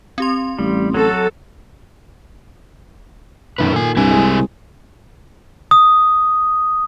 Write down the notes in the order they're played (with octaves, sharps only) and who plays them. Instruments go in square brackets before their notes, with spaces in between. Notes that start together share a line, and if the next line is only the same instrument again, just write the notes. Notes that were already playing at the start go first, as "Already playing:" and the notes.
[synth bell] C4 G4 C6
[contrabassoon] A1 [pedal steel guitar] G3
[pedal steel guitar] F#3 F#4 [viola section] A4
[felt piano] B1 F#2 D#3 [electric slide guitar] C3 A3 B4
[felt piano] A#2 D#3 [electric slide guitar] A4 G#5
[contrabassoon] C2 [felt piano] G2 [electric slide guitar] C3 E4 G#5
[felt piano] G#3
[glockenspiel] D#6